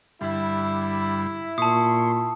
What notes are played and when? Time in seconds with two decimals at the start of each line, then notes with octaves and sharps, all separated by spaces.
0.21 G2 D3 G3 E4
1.58 A#2 A5 C6 C#6 D#6